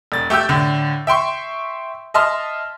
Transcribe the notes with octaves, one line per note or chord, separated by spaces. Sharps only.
E1 A6
A3 G4 G5 E6 G6
A2 D3
E5 G5 C6 C#6
D#5 E5 A5 C6 F6